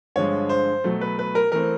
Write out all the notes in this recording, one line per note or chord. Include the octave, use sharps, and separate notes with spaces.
G2 D3 F3 G#3 C#5
C5
B2 F#3 A3
B4
B4
A#4
E3 A3 C4 A#4